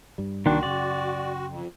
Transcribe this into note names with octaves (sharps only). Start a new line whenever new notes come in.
G2 G3
C2 D#3 A#3 D4 F#4 G5 C6
F#2 C#3 D5
F2